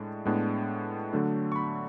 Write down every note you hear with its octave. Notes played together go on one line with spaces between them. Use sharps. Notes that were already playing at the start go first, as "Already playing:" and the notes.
Already playing: A2 G#3 D4
A2 G#3 B3 D4
D3 F#3 A3 D4
C#6
B5